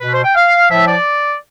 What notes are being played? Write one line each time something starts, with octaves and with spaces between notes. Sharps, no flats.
B2 B4
C5
G5
F5
A2 F3 E5
D5